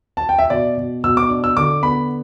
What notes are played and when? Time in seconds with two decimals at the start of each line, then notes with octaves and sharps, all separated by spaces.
0.17 A5
0.29 G5
0.39 E5
0.50 B2 D5
0.77 B2
1.04 B2 E6
1.17 D6
1.29 D4
1.44 E6
1.57 D3 D6
1.83 B3 B5